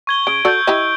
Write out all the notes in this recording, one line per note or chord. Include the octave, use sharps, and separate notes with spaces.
C#6 G#6 G7
C#3 D7
F#4 A4 D5 E6 G6
E4 G4 D#5